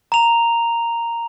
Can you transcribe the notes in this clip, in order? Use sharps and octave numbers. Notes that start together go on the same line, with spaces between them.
A#5 F7